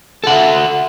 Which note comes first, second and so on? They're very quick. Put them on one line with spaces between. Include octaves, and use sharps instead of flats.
A4 F#5 E5